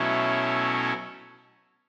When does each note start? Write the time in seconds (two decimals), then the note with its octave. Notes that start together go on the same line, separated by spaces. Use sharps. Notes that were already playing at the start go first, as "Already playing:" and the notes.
Already playing: B2 F#3 A3 C#4 E4